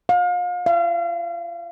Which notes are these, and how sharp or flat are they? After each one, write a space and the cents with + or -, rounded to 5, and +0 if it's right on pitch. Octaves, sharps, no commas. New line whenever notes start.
F5 +35
F5 -35